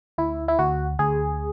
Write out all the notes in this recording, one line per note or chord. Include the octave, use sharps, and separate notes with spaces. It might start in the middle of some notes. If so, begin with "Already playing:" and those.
D2 E4
E4
D2 F#4
D2 G#4